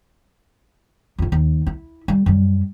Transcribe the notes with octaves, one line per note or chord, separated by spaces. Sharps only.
F2 D#3
D#2
E4
G3
F#2 G3